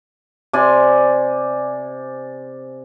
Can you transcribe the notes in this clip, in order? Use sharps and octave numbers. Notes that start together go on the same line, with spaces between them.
C3 D5 G#5